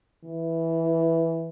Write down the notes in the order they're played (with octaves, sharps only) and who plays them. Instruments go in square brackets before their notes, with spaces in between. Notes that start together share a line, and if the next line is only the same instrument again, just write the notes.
[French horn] E3